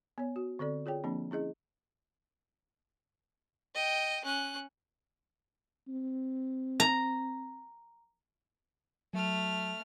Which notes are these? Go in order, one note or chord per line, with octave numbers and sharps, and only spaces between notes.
B3 C#5
F#4
D3 C4 A4 D5
F4 G#4 C#5 G5
F3 A#3 C4 D4
C#4 E4 G#4 D#5
D#5 G5
C#4 F#6
C4
A#5
F#3 A3 F6